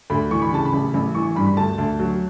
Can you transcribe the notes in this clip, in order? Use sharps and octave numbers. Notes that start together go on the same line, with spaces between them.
D2 B5
E3 C#6
B5
C#3 A5
B5
A1
A1
E3 C#6
G2 B5
B5
D2 A5
D2
F#3